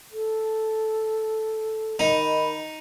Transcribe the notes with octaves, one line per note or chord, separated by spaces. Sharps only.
A4
D#3 D#4 B5